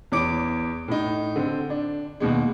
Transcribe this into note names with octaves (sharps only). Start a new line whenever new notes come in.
E2 C#5 D6 D7
A2 D#4
D3 C4
D4
D#2 B2 G#3